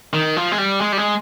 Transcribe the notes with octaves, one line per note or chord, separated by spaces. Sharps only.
D#3
F3
G#3
G3
G#3
G3
G#3